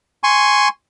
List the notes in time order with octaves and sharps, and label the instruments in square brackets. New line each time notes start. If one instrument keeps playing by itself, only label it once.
[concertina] G#5 C6 C#6